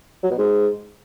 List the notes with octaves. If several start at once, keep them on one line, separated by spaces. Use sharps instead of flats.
F#3
B2
G#2